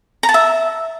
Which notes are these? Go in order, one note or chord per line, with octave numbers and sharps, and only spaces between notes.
A#5
A5
E5